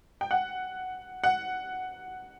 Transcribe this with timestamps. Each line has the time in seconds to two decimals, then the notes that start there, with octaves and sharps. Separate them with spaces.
0.21 G5
0.31 F#5
1.24 F#5